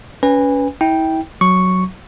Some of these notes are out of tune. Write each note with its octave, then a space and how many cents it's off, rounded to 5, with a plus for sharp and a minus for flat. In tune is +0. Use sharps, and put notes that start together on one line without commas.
C#4 +25 B4 +0 G#5 -30
E4 -35 G5 +0
F#3 +0 C#6 +0